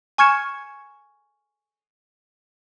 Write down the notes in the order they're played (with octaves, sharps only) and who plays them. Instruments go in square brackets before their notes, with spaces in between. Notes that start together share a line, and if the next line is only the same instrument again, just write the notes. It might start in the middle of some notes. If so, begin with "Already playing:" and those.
[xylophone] G#5 C#6 F6 G#6 C#7 E7